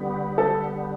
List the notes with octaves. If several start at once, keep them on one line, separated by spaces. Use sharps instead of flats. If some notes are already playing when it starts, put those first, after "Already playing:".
Already playing: D3 G3 B3
A4